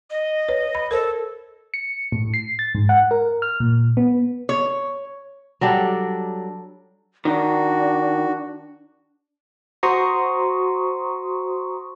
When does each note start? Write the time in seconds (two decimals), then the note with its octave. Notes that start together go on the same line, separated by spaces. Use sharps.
0.10 D#5
0.49 B4 C#5
0.75 B5
0.91 A4 A#4 C5
1.74 C#7
2.12 A2
2.34 C7
2.59 A6
2.75 G#2
2.89 F#5
3.11 A#4
3.42 F6
3.60 A#2
3.97 B3
4.49 C#5
5.61 F#3 G3 D4 A4
7.25 D#3 D4 F#4
9.83 F#4 C5 A#5 C6 C#6 D#6